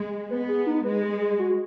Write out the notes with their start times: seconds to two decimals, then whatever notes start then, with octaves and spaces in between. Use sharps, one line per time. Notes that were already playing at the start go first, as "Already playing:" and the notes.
Already playing: G#3
0.30 B3 B4
0.48 G#4
0.66 D#4
0.84 G#3 B4
1.03 G#4
1.21 G#4
1.39 F#4